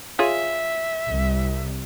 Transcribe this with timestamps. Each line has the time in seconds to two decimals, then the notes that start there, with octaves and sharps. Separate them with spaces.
0.19 F4 G#4 C#5 E5
1.06 C2